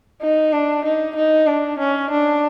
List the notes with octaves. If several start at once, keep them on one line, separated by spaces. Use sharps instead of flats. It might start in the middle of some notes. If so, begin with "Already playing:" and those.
D#4
D4
D#4
D#4
D4
C#4
D4